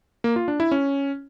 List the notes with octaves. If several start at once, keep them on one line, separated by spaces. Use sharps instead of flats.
A#3
F4
D4
E4
C#4